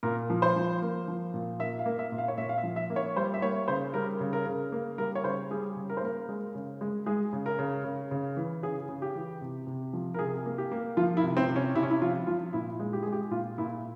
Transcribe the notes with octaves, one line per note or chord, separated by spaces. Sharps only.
A#2 A#4
F3
C5
F3
A#3
F3
A#2
A#3 E5
F5
A#3
E5
A#2
F5
C#5
A#2 E5
F5
E5
F3
E5
A#3
C#5
G3 C5
E5
A#3 C#5
C#3 C5
G3 A#4
C#3
A#4
C#3
A#3
G3 A#4
C#5
C#3 C5
G3 G#4
C#3
A#4
C5
A#3 A#4
G#3
C#3
G#3
G#3 G#4
C#3
A#4
C#3
C#3
C#3
E3
C#3 G#4
C#3
G4
E3
C3
C3
F3
A#4
C3 G#4
A#3
G4
A#3
F3 F4
E4
C3
C4
C3
C#4
C3 E4
C#4
E4
F3 F4
F3 F4
A#2 E4
G#3
G4
G#3 G#4
G4
A#2 F4
A#2 E4